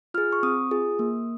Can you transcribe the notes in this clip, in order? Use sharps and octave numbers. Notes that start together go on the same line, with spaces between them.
F4 G#4 F6
C#6
C4 D#6
F4 G#4
A#3